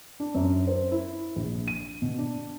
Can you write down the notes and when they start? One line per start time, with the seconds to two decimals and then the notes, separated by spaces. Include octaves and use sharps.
0.20 D4
0.34 F#2
0.67 C5
0.92 E4
1.36 A#1
1.68 D#7
2.02 B2
2.18 D4